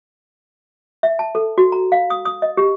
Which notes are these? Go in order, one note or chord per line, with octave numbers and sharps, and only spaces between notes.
E5
A5
A4
F#4
A#5
F5
D#6
D#6
D#5
G4